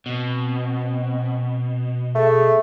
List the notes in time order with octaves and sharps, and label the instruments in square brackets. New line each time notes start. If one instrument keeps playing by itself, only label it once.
[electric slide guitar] B2 [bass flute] C4
[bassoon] A3 [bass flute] G#4